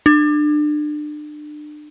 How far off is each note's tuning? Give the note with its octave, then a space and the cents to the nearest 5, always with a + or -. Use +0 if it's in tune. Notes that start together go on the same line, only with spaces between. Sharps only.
D4 +30